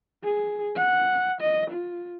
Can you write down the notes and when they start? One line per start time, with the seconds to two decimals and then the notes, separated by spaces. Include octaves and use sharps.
0.24 G#4
0.76 F#5
1.41 D#5
1.70 F4